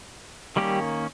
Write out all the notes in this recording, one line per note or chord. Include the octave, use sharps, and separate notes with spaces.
D#3 G3 A#3 C#4 G4